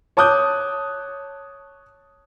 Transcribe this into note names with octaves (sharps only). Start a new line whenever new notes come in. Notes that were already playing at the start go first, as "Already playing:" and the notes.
C#5 A5 D6 D#6 F#6 G6